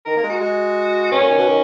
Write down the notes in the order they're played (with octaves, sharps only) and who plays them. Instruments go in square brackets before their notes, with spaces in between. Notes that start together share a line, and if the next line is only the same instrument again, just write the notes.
[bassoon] D#3 [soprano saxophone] A#4
[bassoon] A#3 [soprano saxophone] A#4
[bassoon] G#3
[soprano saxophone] F#4
[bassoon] G#3
[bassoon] B2 [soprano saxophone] C#4
[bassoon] A#2
D#3
B2
D#3